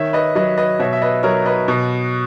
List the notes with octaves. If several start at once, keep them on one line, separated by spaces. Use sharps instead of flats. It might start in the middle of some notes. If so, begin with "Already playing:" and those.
Already playing: D#3 C#5 E5
B4 D#5
F#3 B4 D#5
B4 D#5
B2 C#5 E5
E5
B4 D#5
F#3 A#4 C#5
B4 D#5
B2